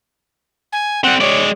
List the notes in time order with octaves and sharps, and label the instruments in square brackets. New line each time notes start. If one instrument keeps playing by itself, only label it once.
[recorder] G#5
[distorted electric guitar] G3 C4 [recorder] F#5
[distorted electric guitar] G#3 D5 [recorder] C#5